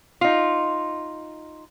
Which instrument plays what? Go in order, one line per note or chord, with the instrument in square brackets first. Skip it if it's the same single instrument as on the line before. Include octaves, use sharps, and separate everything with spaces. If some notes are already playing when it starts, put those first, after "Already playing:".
[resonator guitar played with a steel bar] D#4 F4